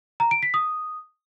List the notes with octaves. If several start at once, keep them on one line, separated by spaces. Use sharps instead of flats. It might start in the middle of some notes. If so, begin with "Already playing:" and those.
A#5
D7
B6
D#6